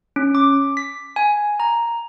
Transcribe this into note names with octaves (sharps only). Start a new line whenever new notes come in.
C#4
D6
B6
G#5
A#5